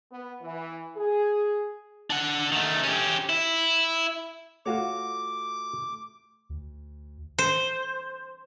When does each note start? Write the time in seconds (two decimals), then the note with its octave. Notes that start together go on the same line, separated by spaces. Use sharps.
0.12 B3
0.41 E3
0.97 G#4
2.10 D4 F#5
2.52 D#3 A3
2.84 C#4 G4
3.29 E4
4.66 A3 F4 F#4 C#5 D6
6.49 D2
7.38 C5